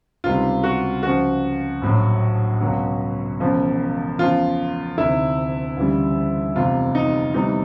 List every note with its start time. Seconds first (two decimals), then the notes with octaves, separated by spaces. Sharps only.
0.24 C#2 C3 D#3 G3 F4
0.63 F#4
1.02 C#2 C#3 F3 F#4
1.82 A#1 A2 F#3
2.61 C#2 B2 F#3
3.40 E1 E2 C#3 F3
4.18 E2 C#3 F3 F4
4.98 D2 C3 D#3 E4
5.77 D2 C#3 E3 G3
6.55 F1 E2 C3 F4
6.95 D#4
7.34 E2 C3 E3 G3 D#4